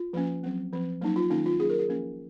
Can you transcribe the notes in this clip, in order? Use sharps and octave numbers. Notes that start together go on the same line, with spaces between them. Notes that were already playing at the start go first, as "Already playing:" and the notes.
Already playing: F4
F3 A#3 C#4
F#3 C4
F3 C4
F#3 A#3 C#4 D#4
F4
D#3 F#3 A#3 C#4 D#4
F4
F#3 A#3 C#4 G#4
A#4
G#4
F3 A#3 C#4